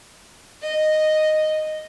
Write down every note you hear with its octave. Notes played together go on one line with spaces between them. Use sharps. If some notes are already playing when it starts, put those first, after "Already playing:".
D#5